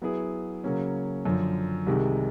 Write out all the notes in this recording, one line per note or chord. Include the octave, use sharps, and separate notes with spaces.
F#3 B3 E4 G#4
C#3 F#3 A#3 C#4
F#2 D3 F3
C2 C3 D#3 G#3